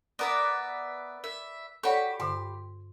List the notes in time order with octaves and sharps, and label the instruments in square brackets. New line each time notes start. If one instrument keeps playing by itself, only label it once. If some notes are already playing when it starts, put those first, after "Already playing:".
[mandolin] B3 A#4 E5 [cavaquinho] B4 D5
[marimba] A#4 [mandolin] E5
[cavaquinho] F#4 C#6 [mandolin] G4 B5 [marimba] A4 C#5 D5
[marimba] G2 D3 [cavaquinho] C6